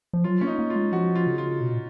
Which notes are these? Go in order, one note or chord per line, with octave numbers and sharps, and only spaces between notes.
F3
F#3 F4
A#3 C#4
D#4
A#3
F4
G#3
F3 F#4
F4
C#3
F4
B2
A#2